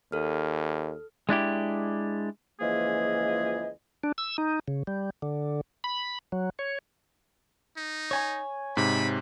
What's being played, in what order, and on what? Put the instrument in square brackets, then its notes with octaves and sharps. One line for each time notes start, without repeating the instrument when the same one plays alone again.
[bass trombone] D#2 [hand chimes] A4 F6
[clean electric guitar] G#3 D4 E4 G4
[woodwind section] C#2 E3 F3 A#3 G#4 D#5
[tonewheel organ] D4
E6
D#4
C#3
G3
D3
B5
F#3
C#5
[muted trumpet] D#4
[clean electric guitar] C#5 G#5
[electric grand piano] G#2 C3 [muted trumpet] B5